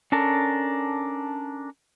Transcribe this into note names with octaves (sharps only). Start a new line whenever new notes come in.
C#4 D4 A4 A#4